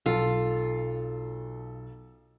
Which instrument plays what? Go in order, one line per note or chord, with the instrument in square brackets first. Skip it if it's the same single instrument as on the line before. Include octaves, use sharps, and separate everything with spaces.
[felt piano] B1 [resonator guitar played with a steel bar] F4 [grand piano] A4